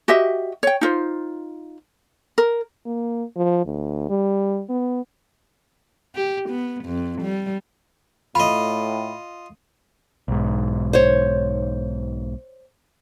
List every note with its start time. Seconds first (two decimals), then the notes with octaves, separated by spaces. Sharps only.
0.08 F#4 G4 D#5 E5
0.63 C#5 G5
0.81 D#4 F4 C5
2.38 A#4
2.86 A#3
3.36 F3
3.65 D2
4.10 G3
4.69 B3
6.15 G4
6.49 B3
6.85 F2
7.22 G3
8.35 A2 F4 D#5 B5
10.28 B1 G#2
10.93 C5 C#5